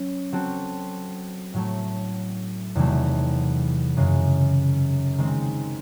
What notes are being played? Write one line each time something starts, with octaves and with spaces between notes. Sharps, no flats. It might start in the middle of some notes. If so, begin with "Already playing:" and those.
Already playing: F#3 C#4
F#3 C4 F#4 A4
A2 F#3 A3
E2 C3 D#3 F#3 A3
F#2 C#3 G#3
D#3 G#3 C4